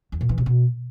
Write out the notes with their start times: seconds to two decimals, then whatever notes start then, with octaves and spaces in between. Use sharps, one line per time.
0.12 E2
0.21 A#2
0.29 E3
0.38 C3
0.46 B2